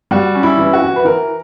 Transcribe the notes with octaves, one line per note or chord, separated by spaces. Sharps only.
G3 F#4
C#4
E4
E3
F#4
E3
B4
E3 A#4